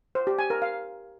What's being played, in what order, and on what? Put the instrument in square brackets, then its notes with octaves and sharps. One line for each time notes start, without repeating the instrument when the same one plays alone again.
[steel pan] C5
G4
G#5
A#4
F5